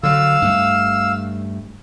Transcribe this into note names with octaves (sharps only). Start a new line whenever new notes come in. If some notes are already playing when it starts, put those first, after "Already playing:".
D3 F#3 F5 E6
G2 A3